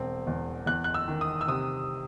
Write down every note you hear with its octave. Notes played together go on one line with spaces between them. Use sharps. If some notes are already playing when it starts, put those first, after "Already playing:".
Already playing: E1 C4
E2
E2 F#6
F#6
E6
D#3
D#6
E6
C3 D#6